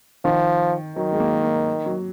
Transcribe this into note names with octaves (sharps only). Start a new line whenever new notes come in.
D#3 F3
D#3 F#3
G#3
A#3
A#3
F#3